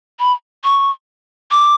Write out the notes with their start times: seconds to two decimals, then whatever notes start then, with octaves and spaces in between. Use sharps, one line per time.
0.19 B5
0.64 C#6
1.51 D6